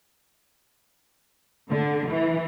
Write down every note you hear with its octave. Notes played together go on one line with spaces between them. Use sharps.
D3
E3